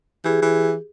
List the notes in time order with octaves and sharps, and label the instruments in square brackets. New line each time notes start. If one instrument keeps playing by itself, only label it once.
[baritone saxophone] E3 [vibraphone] G4 G#4
[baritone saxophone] E3